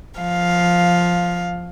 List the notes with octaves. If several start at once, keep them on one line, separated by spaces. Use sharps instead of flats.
F3 F5